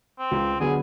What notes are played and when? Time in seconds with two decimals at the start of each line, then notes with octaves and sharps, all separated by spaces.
0.19 C4
0.31 C#2
0.60 D3 F#3 B3 G#4